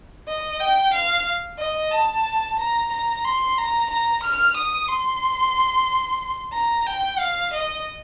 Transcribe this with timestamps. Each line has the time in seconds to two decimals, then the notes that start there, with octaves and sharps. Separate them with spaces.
0.28 D#5
0.60 G5
0.93 F5
1.59 D#5
1.92 A5
2.58 A#5
2.92 A#5
3.25 C6
3.58 A#5
3.90 A#5
4.23 F6
4.57 D#6
4.89 C6
6.53 A#5
6.86 G5
7.20 F5
7.53 D#5